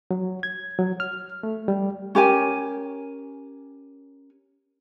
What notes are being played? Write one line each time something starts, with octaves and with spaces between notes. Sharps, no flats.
F#3
G#6
F#3
F6
A3
G3
C#4 G4 A#4 G#5